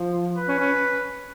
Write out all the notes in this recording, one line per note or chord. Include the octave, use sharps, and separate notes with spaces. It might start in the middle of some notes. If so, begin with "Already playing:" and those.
Already playing: F3
B4
C#4
C#4